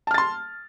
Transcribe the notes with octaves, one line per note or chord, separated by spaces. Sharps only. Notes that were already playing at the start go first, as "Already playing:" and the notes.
A5 C6 F6 A6